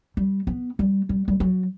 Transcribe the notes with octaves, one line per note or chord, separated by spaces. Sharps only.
G3
B3
G3
G3
G3
F#3